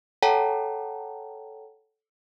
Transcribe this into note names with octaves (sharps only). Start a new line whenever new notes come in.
A4 C#5 F#5 G5 A5 A#5